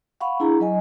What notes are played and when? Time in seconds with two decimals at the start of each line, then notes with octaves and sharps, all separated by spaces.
0.21 F5 F#5 B5 C#6
0.40 D4 E4 G#4 A#5
0.60 F#3 D#5 G#5